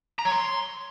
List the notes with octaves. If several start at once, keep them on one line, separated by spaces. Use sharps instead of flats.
A#5
C#5
C6